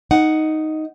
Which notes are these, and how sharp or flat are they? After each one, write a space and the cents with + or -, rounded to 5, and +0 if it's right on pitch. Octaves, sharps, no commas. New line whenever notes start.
D#4 +0 F#5 +5